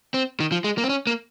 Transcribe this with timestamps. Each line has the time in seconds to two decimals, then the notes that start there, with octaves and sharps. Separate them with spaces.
0.14 C4
0.40 D#3
0.52 F3
0.64 G#3
0.78 A#3
0.84 C4
0.89 C#4
1.07 A#3